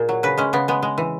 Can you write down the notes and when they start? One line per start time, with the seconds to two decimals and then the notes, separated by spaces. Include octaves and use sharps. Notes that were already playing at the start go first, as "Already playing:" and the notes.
Already playing: A#2 G#4
0.09 F#3
0.23 C#3 B4
0.38 G#3 C#4
0.53 C#3 B3
0.68 G#3 B3
0.82 G#3
0.98 E3